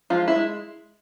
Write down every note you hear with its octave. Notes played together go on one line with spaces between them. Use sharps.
F3 G#3 F4
E4
G#3